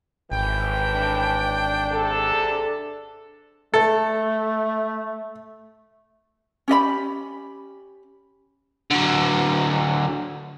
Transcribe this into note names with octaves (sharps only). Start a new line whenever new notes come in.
G#1 A2 E3 G5
D4
C3 G#4 A4
A3 A4
C#4 G4 D#5 B5
D3 F#3